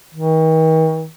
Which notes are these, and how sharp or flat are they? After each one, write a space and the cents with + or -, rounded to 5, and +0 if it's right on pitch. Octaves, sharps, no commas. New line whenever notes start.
D#3 +45